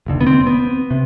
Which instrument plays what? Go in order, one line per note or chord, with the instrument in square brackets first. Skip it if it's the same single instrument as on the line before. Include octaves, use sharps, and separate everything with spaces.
[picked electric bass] F1 D#2 D3
B3
C4
B3
C3